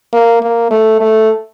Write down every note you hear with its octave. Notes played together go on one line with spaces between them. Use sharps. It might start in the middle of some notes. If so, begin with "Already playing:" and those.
A#3
A#3
A3
A3